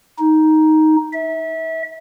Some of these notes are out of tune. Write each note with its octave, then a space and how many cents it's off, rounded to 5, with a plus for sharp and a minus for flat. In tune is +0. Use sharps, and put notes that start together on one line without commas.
D#4 +5
E5 -25